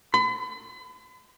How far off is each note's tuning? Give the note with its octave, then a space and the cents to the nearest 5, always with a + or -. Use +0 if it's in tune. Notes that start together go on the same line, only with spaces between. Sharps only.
B5 +40